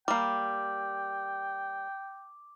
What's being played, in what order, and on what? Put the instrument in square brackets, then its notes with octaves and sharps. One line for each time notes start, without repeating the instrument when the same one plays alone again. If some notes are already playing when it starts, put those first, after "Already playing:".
[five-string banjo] G3 A#3 [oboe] G5 [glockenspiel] D6